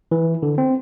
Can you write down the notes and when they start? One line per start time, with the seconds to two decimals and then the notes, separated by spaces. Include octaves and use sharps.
0.11 E3
0.43 D3
0.58 C4